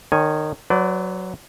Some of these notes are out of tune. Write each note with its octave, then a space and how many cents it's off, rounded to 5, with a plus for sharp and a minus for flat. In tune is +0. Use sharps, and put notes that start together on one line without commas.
D#3 -25 C#5 +0 G#5 +0
F#3 +0 B4 +45 D5 -15